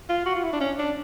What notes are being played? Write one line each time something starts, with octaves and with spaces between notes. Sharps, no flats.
F4
F#4
F4
E4
D4
C#4
D4